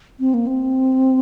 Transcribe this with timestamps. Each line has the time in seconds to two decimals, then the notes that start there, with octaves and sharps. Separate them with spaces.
0.20 C4
0.34 A#3
0.47 C4